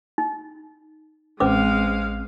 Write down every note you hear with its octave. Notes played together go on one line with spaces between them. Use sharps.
D#4
A1 G#3 C4 C#4 B4 F5 D6